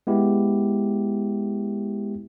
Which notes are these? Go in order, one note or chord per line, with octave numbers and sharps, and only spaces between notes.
G#3 B3 E4 G4